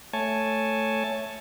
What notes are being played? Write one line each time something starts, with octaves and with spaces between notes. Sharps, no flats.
A3 C#5 G#5 A5